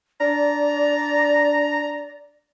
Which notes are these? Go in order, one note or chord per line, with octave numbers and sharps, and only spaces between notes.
D4 D5 A#5